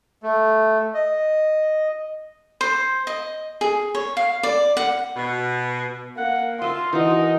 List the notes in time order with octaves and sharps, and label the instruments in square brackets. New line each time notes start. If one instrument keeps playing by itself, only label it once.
[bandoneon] A3
D#5
[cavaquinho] C5
D#5
G#4
C#5
F5
D5
F#5
[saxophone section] B2
[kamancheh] A#3 [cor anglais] F#5
[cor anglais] F4 [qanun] D#5 E5 [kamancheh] C6
[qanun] E3 F#4 [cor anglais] D#4 [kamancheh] A#4 D#5